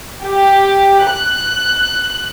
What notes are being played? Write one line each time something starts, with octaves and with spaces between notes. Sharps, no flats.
G4
F#6